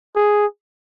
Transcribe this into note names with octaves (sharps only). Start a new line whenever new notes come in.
G#4